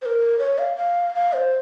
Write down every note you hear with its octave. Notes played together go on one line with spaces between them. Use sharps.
C5
A#4
C#5
F5
F5
F5
C5